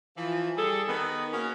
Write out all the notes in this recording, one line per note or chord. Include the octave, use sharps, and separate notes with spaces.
E3 F3
G3 G#4 A4
D#3 B3
A#3 C#4 F#4 G#4 A#4 B4